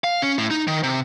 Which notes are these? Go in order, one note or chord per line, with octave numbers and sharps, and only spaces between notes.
F5
C#4
A2
D#4
D#3
C3